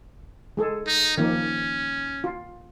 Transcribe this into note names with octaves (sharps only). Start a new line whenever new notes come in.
G#3 G#4 A4
D#4
D#3 F3 A#3 C#4
F4